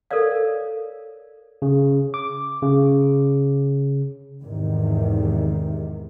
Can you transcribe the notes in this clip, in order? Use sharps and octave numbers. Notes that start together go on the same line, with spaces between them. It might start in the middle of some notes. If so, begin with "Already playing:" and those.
A4 A#4 C#5 D5 F5
C#3
D6
C#3
E2 G#2 C3 D#3